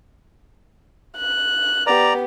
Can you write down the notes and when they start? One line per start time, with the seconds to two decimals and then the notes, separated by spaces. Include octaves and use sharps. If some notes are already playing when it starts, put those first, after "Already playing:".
1.17 F#6
1.87 B3 G4 D5 A#5